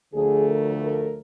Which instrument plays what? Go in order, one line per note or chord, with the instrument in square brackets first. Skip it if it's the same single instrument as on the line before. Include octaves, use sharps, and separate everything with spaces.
[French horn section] D2 D3 F3 A3 G#4
A#4
A#4